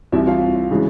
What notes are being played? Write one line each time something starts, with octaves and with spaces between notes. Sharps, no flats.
C2 C3 E3 E4 E5
F4 F5
C#3 E3 G#3